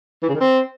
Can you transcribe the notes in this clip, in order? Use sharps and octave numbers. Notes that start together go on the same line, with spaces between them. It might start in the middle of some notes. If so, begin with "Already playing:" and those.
E3
C#3
D#3
C4